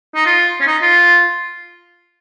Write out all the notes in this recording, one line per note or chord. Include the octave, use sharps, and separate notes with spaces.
D#4
F4
C#4
D#4
F4